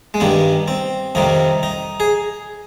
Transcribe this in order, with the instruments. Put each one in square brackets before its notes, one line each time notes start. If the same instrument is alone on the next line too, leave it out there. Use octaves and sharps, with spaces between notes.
[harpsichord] G#3
G2 D#3 G3 B3
C4
F2 C3 D#3 G3 D#4
D#4
G#4